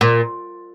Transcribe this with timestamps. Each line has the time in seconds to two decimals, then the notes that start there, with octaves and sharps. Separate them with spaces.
0.01 A#2